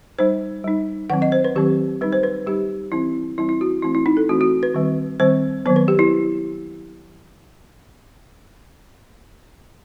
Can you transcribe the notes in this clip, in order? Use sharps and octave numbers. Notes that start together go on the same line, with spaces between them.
G3 D#4 C5
G3 D#4
D#3 F#3 C4 F#5
D#5
C5
B4
D#3 F#3 C4 G4
G3 D#4 B4
C5
B4
G3 D#4 G4
E3 G3 C4 E4
E3 G3 C4 E4
E4
F#4
E3 A3 C4 E4
E4
D#4
A4
E3 A3 C4 F#4
F#4
B4
D#3 G3 C4
D#3 G3 C4 C5
D#3 F#3 B3 C5
B4
G4
E4